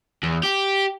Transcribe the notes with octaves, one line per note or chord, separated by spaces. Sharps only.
E2
G4